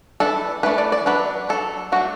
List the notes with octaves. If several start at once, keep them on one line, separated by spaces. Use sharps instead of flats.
E3 A3 D4 A4
E3 A3 D4 B4
D5
D5
F#3 D4 B4
F#3 D4 A4
F#3 A3 D4 F#4